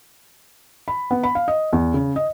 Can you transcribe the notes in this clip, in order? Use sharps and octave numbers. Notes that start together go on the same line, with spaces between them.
B5
B3
B5
F5
D#5
E2
C#3
D#5